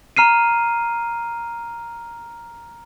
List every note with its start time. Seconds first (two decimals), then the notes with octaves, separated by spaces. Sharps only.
0.17 A#5 F6 C7 D#7